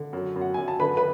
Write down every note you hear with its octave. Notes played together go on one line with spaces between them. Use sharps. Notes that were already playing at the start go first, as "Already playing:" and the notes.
Already playing: D3
F#2
F#2
F#5
F#2 G#5
A5
D3 B4 B5
B4 B5